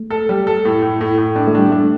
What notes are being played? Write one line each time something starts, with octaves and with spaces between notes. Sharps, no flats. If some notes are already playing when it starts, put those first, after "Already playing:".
Already playing: A3
A4
G3
A4
A2
A2
A2
A2
D4
A3
G3 D4
A3 D4